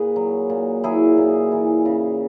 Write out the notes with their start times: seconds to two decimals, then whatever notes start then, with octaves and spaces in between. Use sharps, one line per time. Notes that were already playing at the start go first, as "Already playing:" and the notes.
Already playing: A#2 G#4 B4
0.16 F#3
0.50 A#2
0.84 F#3 E4 G#4
1.18 A#2
1.52 E3
1.85 C#3